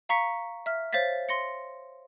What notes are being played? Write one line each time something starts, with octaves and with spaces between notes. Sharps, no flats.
F5 A#5 C#6 B6 C#7
E5 F6
C5 C#5 F5 A6 B6
C6 A#6 C#7